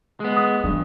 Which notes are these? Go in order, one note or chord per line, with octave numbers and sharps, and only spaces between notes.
G#3 B3
D#6
G2 E3 G3